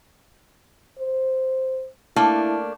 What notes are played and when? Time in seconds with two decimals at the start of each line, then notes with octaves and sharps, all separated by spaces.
0.99 C5
2.16 A3 A#3 D4 E4